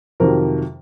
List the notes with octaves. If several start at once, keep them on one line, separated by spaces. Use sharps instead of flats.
F2 C3 D#3 F#3 A#4